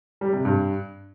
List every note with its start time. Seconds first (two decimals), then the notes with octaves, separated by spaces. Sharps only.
0.21 G3
0.33 C3
0.45 G2